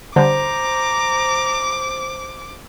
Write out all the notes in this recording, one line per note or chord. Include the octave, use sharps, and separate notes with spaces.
D3 G3 C5 A#5 D6